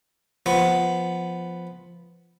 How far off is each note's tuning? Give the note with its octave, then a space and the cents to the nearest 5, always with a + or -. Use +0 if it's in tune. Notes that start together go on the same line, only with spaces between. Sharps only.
F3 +0 B3 +0